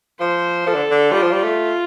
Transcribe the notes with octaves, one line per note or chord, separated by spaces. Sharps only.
F3 C5
F3 A4
D3
D3
G3 F4
F3
G3
A3